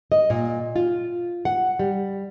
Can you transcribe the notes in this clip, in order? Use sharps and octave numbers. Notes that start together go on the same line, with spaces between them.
D#5
A#2
F4
F#5
G3